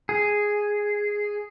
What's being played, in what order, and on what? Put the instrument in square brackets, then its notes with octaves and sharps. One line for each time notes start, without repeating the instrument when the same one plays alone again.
[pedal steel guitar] G#4